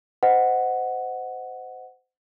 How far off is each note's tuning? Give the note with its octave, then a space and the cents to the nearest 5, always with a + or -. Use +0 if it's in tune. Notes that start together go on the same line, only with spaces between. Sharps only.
C5 -25 D#5 +0 F#5 +0